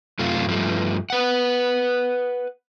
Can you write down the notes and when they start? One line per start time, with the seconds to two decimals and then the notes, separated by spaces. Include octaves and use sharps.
0.19 F#2 C3 A3 F4
0.47 G2 F3 A3
1.10 B4 F#5